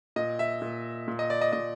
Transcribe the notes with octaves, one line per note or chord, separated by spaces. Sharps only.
A#2 D#5
E5
A#2
A#2
D#5
D5
D#5
A#2 D#5